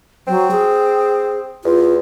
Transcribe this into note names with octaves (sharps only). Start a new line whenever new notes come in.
F#3 C4
G#4
E2 F4